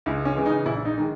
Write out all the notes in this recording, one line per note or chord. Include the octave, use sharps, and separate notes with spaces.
C#2 E4
C#4
C#3 E3 G#3
D#4
A#1 E4
D#4
D#3 G#3